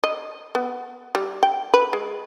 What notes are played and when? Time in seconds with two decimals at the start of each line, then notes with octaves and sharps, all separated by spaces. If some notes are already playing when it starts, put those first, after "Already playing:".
0.04 D#5
0.55 B3
1.15 G3
1.43 G5
1.74 B4
1.93 G#3